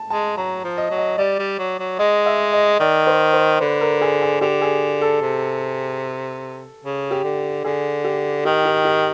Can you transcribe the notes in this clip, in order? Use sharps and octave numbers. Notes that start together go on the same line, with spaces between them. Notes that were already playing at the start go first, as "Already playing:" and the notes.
Already playing: A5
G#3 A5
F#3 A#5
F3
D#5
F#3
D#5
G3 D5
G3
F#3
F#3
G#3 D#5
E5
D#5
D#3 D5
C5
C5
D3 B4
A#4
G#4
G#4
D3 G4
G#4
A4
C3
C#3
G4
D3
D3 G#4
G4
D#3 G4
G4
G4